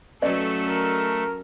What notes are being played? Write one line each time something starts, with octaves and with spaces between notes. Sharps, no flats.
F#3 A3 C#4 A4 B4 D5 D#5
A#4